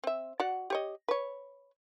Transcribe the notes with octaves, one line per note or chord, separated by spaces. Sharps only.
C4 E5
F#4 D5 F#5
G4 C#5 D#5
B4 C#5